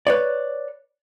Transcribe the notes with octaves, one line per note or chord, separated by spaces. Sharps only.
B4 C#5 D5